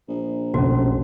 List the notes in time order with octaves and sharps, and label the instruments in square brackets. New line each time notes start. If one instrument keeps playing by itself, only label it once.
[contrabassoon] A#1
[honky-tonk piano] F1 [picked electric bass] B1 [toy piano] C#4 F#4